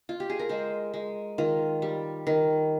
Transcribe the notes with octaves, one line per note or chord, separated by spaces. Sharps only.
F4
G4
G#4
A#4
G#3 C5
G#3
D#3 F4
G3
D#3